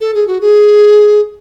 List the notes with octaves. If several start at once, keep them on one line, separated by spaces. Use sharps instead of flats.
A4
G#4
F#4
G#4